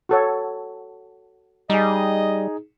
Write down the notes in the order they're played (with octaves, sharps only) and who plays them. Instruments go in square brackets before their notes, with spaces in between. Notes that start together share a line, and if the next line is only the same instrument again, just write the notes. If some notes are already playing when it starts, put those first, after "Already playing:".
[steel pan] F#4 A4 C#5
[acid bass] G3 [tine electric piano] D#4 G#4 [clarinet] D#5